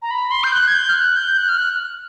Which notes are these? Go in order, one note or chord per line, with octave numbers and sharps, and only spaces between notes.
A#5
B5
C6
G6
F#6
G#6
G6
F6
F#6
G6
F#6
F6
F#6